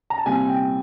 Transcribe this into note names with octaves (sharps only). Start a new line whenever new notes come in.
A#5
A5
C2 A#2 G3 C4 G#5
G5